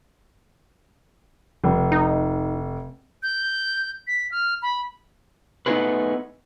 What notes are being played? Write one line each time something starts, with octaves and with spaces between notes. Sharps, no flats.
F1
D#4
G6
B6
F6
B5
A3 B3 D#4 E4 G#4 B4